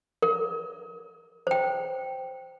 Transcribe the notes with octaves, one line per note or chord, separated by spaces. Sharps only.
A#4
C5 G5